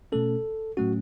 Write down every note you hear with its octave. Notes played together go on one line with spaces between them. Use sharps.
B2 A3 C#4 A4
A2 F#3 A3 C#4 F#4